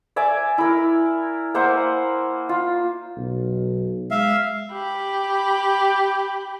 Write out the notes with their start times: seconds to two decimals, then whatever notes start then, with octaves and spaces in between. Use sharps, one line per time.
0.16 D5 E5 G#5 D6
0.58 E4 A#4
1.55 A#3 C5 E5 F#5
2.49 F4
3.17 B1
4.11 G#3 E5 F5
4.72 G4 B5